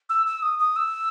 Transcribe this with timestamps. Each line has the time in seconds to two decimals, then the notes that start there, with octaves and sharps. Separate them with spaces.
0.09 E6
0.26 E6
0.42 D#6
0.59 D#6
0.76 E6